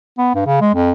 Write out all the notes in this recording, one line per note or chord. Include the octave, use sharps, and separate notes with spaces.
B3
G2
C#3
G#3
F2